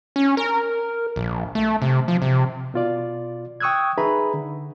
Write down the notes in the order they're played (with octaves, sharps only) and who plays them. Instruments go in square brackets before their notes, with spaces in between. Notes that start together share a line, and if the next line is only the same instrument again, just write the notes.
[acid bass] C#4
A#4
A#1
A3
C3
F3
C3
[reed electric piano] B2 F4 D5
G5 C#6 D#6 E6 F#6 G#6
D#4 G#4 B4 E5 A#5 B5
D3